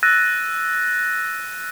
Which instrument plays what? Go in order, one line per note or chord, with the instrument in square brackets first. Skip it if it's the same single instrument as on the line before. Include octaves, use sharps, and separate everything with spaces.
[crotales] E6 F#6 A6 A#6 D#7